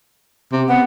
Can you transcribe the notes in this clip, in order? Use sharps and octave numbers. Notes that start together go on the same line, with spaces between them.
C3
B3 F#5